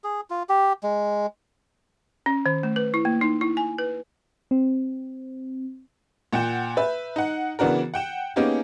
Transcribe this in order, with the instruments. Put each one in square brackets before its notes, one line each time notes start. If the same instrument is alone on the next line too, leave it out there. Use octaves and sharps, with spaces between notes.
[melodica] G#4
F4
G4
G#3
[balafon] C#4
D#3
A3
B4
E4
A#3
D#4
E4
G#5
B4
[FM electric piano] C4
[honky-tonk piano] A#2 F#5 G5 G6 E7
B4 E5
D#4 F#5
C#3 E3 B3 D4 F#4 A#4
F#5 G5 E7
A#3 B3 C#4 D#4 G4 G#4